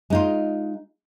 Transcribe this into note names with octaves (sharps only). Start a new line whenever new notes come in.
G#3 D#4 F4